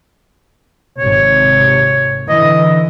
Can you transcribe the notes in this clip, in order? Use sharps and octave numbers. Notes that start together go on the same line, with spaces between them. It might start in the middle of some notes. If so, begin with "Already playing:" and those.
G#1 C3 C#5
D3 E3 D#5